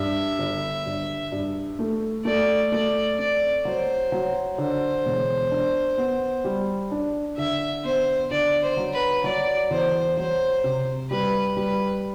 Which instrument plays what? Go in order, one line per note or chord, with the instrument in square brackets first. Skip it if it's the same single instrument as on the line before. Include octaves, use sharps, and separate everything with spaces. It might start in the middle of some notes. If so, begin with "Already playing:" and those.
Already playing: [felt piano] G2 [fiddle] E5
[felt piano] G1
G2
G2
A3
[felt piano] A3 [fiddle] D5
[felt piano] A3 [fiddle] D5
[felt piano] C4 [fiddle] D5
[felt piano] F#3 [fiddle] C5
[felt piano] F#3
[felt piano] D3 [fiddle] C5
[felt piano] E1
D4
B3
G3
D4
[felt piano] D3 [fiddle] E5
[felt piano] B3 [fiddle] C5
[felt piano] D3 [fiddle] D5
[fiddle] C5
[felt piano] F#3
[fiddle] B4
[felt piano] F#3 [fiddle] D5
[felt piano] E2 [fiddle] C5
[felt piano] F#3 [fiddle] C5
[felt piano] C3
[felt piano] G3 [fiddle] B4
[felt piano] G3 [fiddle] B4